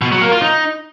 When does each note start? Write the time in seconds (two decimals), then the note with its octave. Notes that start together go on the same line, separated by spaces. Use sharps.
0.01 B2
0.12 F#3
0.22 A#3
0.32 F4
0.42 D#4